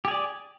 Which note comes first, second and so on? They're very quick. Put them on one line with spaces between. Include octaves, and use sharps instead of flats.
G4 G#4 D5